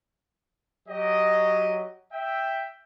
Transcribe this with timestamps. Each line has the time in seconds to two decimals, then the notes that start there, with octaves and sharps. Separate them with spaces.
0.88 F#3 G4 D#5
2.12 E5 G5